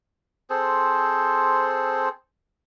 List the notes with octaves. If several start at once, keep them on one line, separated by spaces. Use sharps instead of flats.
C4 G#4 A4 C5